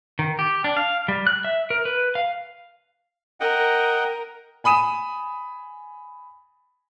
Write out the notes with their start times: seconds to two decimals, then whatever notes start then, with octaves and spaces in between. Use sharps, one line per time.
0.19 D#3
0.39 G4
0.64 D4
0.77 F5
1.08 G3
1.27 F#6
1.45 E5
1.70 A#4
1.85 B4
2.15 F5
3.40 A#4 D#5 F#5 G5
4.64 G#5 B5 D#6 D#7 E7